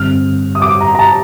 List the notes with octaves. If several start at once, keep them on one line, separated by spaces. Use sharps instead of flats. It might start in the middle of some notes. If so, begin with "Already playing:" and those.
Already playing: G2 D3 G3 C4 F6
D#6
D6
A#5
A#5
A5